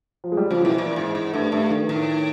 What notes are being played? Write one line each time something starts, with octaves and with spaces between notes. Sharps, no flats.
F3
G#3
G3
C#3 F3
B2 E3
A#2
G#2
G#2
G2 A3
G2 A3
D#3
A2 D#3